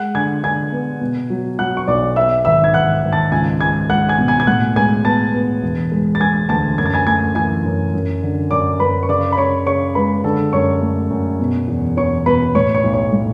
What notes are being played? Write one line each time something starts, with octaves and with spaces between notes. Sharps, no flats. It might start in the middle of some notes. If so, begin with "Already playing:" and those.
Already playing: G#3 F#5 F#6
D3 G#5 G#6
D3 G#5 G#6
B3
B2
F#3
F#3 F#5 F#6
C#6
B1 D5 D6
B3 E5 E6
G#1 E5 E6
G#6
G#1 F#5 F#6
G#1
A5 A6
C#2 G#5 G#6
G#3 G#5 G#6
G#3 F#5 F#6
G#5 G#6
B2
G#5 G#6
G#6
A2 F#5 F#6
G#3 G#5 G#6
B3 A5 A6
B3
E1
G#3
A6
G#3 G#5 G#6
D2 A5 A6
F#2 G#6
A6
G#5 G#6
A3 G#5 G#6
E3 G#5 G#6
F#2
F#2
D3
F#2 D5 D6
F#2 B4 B5
C#6
C#3 D5 D6
B5
C#3 C#5 C#6
C#3 C#5 C#6
G#3 B4 B5
D3 A4 A5
F#2 C#5 C#6
A3
F#2
B2
E2
E2 C#5 C#6
B2 B4 B5
A2 C#5 C#6
C#5 C#6
B1
C#5 C#6
A2